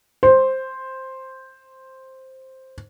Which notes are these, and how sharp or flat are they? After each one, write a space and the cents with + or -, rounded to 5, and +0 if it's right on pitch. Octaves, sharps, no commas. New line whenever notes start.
C5 +5